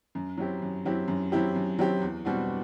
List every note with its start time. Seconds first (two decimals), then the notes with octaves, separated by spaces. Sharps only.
0.15 F#2
0.37 F#3 C4 E4 G4
0.62 F#2
0.85 F#3 C4 E4 G4
1.08 F#2
1.32 F#3 C4 E4 G4
1.56 F#2
1.79 F#3 C4 E4 G4
2.02 E2
2.25 B2 G3 C4 F#4